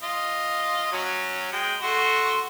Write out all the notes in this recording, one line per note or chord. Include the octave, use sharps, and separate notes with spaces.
F4 D#5
F#3 C#4
G#3 G5
A3 F#4 C6